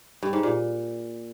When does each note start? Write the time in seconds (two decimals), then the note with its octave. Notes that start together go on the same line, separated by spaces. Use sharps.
0.22 G2
0.33 G#2
0.43 A#2